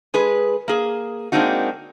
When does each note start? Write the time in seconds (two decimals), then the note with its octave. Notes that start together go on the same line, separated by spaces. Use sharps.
0.14 G#3 G#4 B4
0.68 A#3 G#4
1.32 G#3 A#3 C4 D4 D#4 F#4